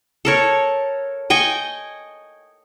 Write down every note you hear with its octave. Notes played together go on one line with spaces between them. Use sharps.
A4 A#4 C#5
D#5 G5 G#5 C#6